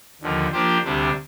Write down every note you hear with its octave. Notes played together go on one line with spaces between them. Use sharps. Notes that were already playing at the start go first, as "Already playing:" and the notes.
D#2 D3 F3
F3 A#3 D4 G4 C5
D2 C3 G3 D4